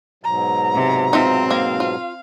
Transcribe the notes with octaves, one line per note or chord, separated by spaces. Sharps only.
G#2 B2 F#3 A#5
C3
C4 D#4 F4 E5
A#3 F5
F4